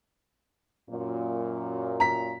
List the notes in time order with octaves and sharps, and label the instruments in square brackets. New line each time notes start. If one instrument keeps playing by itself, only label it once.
[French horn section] F#2 A#2
[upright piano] A#5 B6